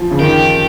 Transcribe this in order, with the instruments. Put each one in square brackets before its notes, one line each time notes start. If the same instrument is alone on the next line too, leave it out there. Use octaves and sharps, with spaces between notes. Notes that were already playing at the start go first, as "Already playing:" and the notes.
Already playing: [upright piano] F3
C#3
[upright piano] D#3 [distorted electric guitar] G4